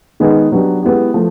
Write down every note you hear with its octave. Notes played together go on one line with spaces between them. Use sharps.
D#3 G#3 B3 D#4 G#4
F#3 B3 D4 G4
G#3 B3 E4 G4
F3 A3